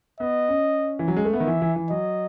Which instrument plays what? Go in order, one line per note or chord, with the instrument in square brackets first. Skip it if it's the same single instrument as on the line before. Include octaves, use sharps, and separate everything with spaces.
[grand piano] B3 [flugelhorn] D#5
[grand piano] C#4
E3
F#3
G#3
A3
[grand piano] B3 [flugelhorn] E5
[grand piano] D#3
E3
E3
E3
[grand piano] F#3 [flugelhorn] D#5